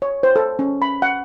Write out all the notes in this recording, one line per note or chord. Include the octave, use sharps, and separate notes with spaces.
C#5
C5
A4
C#4
B5
F#5